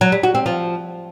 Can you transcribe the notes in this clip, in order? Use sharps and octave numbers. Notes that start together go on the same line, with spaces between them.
F#3
G3
F#4
C4
F3